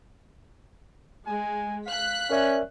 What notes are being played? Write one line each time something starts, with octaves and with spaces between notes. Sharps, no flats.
G#3 G#5
F5 F#6 B6
C#4 A#4 D5 E5